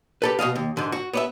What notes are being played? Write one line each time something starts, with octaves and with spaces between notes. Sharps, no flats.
G4 A4 B4
B2 E3 D#5 F5
D#2
G#2 D3
F#4
B3 D5 E5